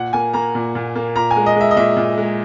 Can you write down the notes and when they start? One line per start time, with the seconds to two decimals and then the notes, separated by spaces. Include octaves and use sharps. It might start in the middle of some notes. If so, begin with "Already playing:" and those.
Already playing: A#2 F#5
0.13 A#3 G#5
0.33 A#3 A#5
0.55 A#2
0.75 A#2
0.95 A#3
1.15 A#2 A#5
1.31 G#5
1.36 G#3
1.46 D#5
1.56 G#3 E5
1.71 D#5
1.76 A#2 E5
1.97 A#2
2.18 G#3